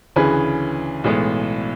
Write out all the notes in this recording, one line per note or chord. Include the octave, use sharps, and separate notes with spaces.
D2 C#3 E3 G#4 B4
B1 A2 E3 G#3 B3